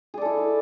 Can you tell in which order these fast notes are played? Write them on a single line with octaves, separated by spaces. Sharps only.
G#4 D5 A4 E4